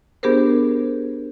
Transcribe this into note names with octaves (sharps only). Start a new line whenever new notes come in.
B3 D4 G4 G#4 A#4 C5